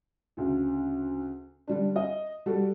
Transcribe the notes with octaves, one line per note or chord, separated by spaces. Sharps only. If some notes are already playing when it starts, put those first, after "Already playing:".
D2 C#3
D3 G3 D4
D#5
G3 F#4 G4 A4